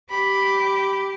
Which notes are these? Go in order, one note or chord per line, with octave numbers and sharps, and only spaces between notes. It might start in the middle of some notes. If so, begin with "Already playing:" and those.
G4 B5